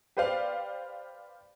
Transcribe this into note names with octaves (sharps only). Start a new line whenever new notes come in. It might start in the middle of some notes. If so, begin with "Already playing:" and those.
G4 B4 C5 D5 F5